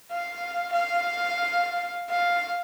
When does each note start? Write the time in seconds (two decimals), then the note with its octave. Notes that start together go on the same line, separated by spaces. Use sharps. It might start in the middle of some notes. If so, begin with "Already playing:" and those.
0.11 F5
0.72 F5
2.10 F5